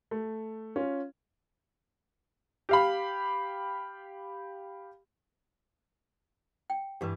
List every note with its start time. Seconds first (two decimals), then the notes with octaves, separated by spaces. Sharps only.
0.11 A3
0.76 C#4 F4
2.69 G4 F5 B5
6.70 G5
7.01 G2 E3 G4 B4